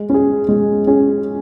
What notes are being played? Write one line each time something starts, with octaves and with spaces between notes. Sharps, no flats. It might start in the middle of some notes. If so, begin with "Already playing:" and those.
Already playing: G#3
C#4 G#4
G#3
C#4 G#4